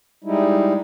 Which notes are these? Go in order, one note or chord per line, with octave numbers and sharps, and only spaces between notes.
G3 G#3 D#4 E4